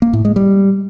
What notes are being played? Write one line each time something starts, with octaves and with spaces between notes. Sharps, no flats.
A#3
A2
G#3
G3